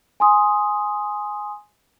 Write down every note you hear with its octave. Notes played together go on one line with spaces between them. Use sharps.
G#5 C6 D#6